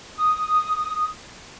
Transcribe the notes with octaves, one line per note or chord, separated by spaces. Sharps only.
D#6